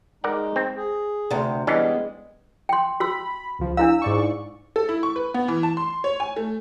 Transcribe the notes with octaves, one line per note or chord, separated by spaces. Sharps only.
G#3 D#4 A#4 D5 F#5
C4
G#4
D2 C3
E3 G3 G#3 B3 C#4 D4
G5 C6
F#4 B5 E6
C#2 F3
D4 E4 F5 E6
G#2 D5 C#6
A4
E4
C#6
B4
B3
E3
A5
C6
C#5
G#5
A3